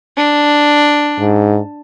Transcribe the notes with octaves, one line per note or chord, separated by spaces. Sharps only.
D4
G#2